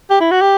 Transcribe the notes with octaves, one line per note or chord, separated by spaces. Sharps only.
G4
E4
F#4
G4